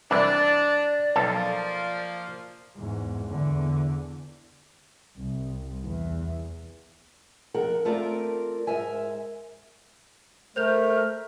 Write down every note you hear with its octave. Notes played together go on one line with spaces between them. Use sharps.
C2 E3 D4 D5
B1 F3 A#3 A4 A5
E2 G#2
E2 D3
C2
E2
F2 A#4 F#5
A3 C4 F4 A#4 D5
G#2 A#4 E5 G#5
A3 A#4 C5 G6 F7